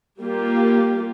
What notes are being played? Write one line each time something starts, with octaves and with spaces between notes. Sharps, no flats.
G3 A#3 F4 G4